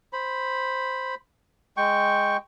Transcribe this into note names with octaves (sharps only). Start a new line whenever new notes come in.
C5 B5
G#3 G5 C#6